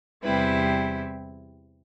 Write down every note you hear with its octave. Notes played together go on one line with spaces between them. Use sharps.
E2 C3 G3 C4 E4 B4